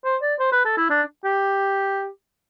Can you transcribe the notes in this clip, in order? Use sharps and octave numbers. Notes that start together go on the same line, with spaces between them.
C5
D5
C5
B4
A4
E4
D4
G4